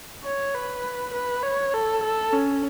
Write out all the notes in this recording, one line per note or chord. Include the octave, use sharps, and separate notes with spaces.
C#5
B4
B4
C#5
A4
A4
C#4